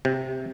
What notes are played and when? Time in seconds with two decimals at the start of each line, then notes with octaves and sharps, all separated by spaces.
0.05 C3